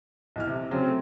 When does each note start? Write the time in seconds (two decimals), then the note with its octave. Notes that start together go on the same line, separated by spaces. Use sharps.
0.36 B1 E3 F6
0.47 C3
0.71 C#3 F#3 C4
0.86 A3